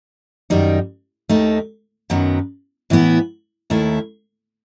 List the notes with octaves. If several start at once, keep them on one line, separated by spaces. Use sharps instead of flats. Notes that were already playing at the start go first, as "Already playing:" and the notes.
F#2 D#3 G3 D#4
D#2 D#3 A3 D#4
F#2 D#3 F#3 B3
A2 E3 B3 E4
D#2 D#3 A3 E4